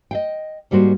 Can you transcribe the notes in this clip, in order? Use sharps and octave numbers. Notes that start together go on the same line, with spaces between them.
D#5 F5 G5
G#2 G3 A#3 F#4 C5